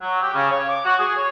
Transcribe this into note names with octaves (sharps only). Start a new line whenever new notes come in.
F#3
G4
C#3
C#5
D6
F#4
G#4
C#5